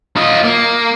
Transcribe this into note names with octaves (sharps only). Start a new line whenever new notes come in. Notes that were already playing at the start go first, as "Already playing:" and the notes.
F4 D#5
A#3